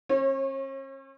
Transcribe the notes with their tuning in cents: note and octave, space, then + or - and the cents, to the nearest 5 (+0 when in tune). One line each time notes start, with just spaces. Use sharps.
C#4 -45 C#5 -25